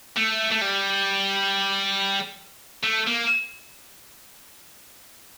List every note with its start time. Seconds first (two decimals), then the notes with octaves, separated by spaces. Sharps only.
0.17 A3
0.52 A3
0.61 G3
2.84 A3
3.07 A#3